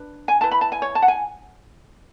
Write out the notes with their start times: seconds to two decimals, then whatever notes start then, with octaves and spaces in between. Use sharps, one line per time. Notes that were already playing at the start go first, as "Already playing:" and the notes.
Already playing: D4 B4
0.28 G#5
0.41 E4 B4 A5
0.51 B5
0.61 A5
0.72 G#5
0.82 C#5
0.95 A5
1.02 F#5
1.08 G#5